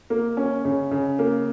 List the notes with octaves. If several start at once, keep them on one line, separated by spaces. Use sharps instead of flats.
A#3
C#4
C#3
C#3
A#3